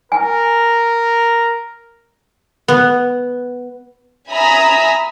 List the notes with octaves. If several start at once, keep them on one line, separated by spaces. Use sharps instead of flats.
A#4 G#5
B3
E5 G#5 A#5 B5 D#6 E6